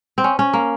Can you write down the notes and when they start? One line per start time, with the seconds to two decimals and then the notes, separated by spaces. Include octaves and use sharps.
0.18 C4
0.24 C#4
0.39 C#4
0.53 A#3